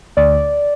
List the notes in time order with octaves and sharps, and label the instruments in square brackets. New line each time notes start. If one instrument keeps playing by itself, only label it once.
[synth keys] D2 D5